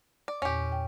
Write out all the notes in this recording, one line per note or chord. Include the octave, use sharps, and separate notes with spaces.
D5
E2 A#2 C#4 G4
G5